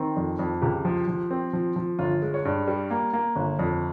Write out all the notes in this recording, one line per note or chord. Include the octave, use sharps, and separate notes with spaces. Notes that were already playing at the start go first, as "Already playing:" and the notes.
Already playing: D#3 C4
F2
F2
C#2 G4
F3
F3
C4
F3
F3
G1 F4
G#3
C#5
G2
G3
A#3
A#3
G1
F2